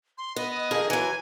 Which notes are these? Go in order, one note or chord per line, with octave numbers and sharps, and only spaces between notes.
C6
B3 D#5
D#5
F2 D#3 G#4
E3 F#3 G#5